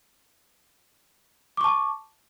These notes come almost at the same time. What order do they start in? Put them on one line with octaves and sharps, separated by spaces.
D6 C#6 A5